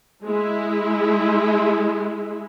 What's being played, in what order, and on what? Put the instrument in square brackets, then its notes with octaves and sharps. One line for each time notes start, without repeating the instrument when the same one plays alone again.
[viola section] G#3 E4